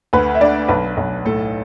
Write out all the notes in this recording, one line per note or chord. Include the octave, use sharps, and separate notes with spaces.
D2 B4
E5
D4 D5
B1 B4
B1
A2 A4